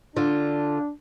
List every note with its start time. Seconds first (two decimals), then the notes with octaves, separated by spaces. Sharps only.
0.16 D3 D4 F4